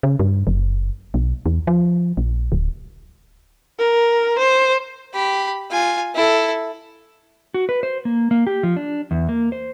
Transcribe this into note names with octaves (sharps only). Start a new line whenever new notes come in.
C#3
G2
F#1
B1
E2
F3
A#1
D1
A#4
C5
G4 B5
F4 G#5
E4 A4
F#4
B4
C5
A#3
A#3
G4
F3
D4
E2
A#3
C5